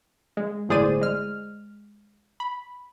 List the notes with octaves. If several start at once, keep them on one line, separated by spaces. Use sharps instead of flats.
G#3
G1 A2 G#4 C5 D5 D#7
G#3 F6
B5